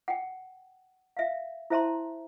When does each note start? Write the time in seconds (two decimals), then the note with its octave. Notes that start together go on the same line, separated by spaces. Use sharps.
0.08 F#5 G5
1.17 E5 F5
1.70 E4 C5 E5 A5 A#5 C6